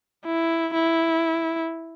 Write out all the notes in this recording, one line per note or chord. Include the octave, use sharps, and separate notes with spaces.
E4
E4